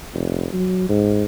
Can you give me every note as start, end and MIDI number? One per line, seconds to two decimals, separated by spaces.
0.14 0.47 29
0.53 0.85 54
0.89 1.25 44